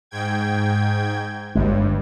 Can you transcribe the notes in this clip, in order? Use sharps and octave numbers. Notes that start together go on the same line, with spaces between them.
G#2 G5 G#6
G1 G2 G#3